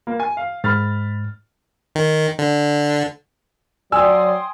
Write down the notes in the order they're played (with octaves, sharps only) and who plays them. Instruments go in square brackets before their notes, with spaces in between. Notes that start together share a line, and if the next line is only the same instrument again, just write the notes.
[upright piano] A#3
G#5
F5
[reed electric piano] G#2 [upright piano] B5 F6 A6
[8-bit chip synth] D#3
D3
[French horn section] F#3 D5 [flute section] G5 C6 D#6 [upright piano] G#5 [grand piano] E6